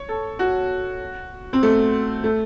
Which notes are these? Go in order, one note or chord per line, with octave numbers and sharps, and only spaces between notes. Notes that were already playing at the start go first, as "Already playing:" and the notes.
Already playing: C#5
A4
F#4
C4
A3
A3